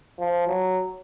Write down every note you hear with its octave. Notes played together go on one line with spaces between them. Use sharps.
F3
F#3